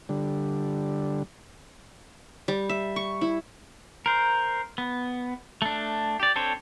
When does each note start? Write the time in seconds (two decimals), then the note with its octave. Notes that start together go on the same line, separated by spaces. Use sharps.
0.09 D3 G3
2.48 G3
2.69 E5
2.96 C#6
3.21 E4
4.06 A#4 C5
4.78 B3
5.62 A3 D4
6.20 G4 D5
6.36 C4 D4 A4 C5 C#5